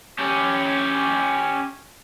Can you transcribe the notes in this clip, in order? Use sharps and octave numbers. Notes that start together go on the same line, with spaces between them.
C#4 G4